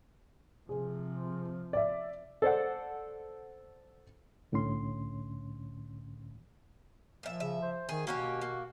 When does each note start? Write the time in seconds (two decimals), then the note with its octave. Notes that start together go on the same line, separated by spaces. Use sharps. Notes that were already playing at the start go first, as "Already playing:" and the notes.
0.69 C3 F3 G#4
1.73 D5 E5
2.42 A4 C5 D5 F#5
4.52 C2 A2 D3 C#4 C6
7.23 A#2 F3 E5
7.40 C#3 E5
7.62 C5
7.89 D#3 G#4
8.07 B2 A#3 C#4 F#4 G4
8.41 A#3